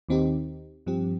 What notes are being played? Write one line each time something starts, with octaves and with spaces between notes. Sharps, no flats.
D#2 D#3 C4 D#4 G4
G2 F3 C4 G4